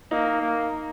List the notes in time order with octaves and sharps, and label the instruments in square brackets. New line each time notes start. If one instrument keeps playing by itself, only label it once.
[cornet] A#3 [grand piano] D#4
[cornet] A#3